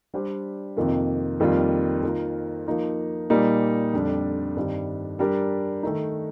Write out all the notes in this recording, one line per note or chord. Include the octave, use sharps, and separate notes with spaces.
G3 D4 G4 C5
F2 C3 D#3 A#3 F4
F2 D#3 G3 A#3 F4
D#3 A#3 F4 A#4
F3 A#3 D#4 A#4
A#2 G3 A#3 D#4
F2 D3 G3 D4
G2 D#3 G3 C4
G3 D4 G4 A#4
D#3 A3 D#4